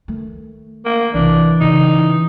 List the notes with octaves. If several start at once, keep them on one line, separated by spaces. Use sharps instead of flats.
D#3 A3
A#3
B1 C3 E3 D4
C#3 C#4 D#4